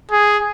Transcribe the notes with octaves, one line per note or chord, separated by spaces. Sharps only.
G#4